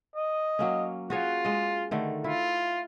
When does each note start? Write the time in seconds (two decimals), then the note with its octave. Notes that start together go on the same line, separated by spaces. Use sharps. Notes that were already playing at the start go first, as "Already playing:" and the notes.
0.16 D#5
0.59 F#3 A#3 C#4
1.10 F4 F#4 G#4 C#5
1.45 G#3 D#5
1.91 D3 D#3 A3
2.24 E4 F4